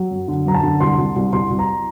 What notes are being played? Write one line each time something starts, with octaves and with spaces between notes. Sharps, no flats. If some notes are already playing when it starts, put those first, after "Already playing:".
Already playing: F#3
F#2
D3
F#2 A#5
A5
D3
C2 C6
C2
C2
C2 C6
C2
A#5